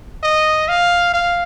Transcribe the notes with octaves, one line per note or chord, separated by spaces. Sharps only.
D#5
F5
F5